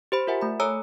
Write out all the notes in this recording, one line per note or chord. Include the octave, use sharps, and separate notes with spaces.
G4 C5 B5
F4 A#4 E5 F#5 G#5
A3 B5
A4 C#5 G#5 A#5 D#6 E6